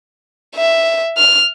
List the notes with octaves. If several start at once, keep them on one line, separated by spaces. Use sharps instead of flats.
E5
F6